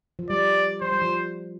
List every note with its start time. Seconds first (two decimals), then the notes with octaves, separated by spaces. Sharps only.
0.19 F3
0.30 G3 D5
0.81 F3 C5
0.92 G3
1.02 F3